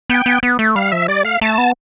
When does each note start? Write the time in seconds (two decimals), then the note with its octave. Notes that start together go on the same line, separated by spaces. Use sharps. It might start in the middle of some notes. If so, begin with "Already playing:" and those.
0.10 B3 G5
0.26 B3
0.43 B3
0.59 A3
0.75 G3 F5
0.92 F3 E5
1.08 G3 D5
1.24 A3 F5
1.41 A3 A5
1.58 B3